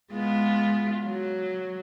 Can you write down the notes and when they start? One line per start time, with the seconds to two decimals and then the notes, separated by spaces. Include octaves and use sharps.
0.11 G#3 B3 F4
1.06 F#3